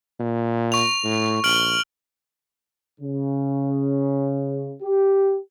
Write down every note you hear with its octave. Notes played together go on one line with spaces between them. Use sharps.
A#2
C#6 F7
A2
A#1 F6 D7 F#7
C#3
G4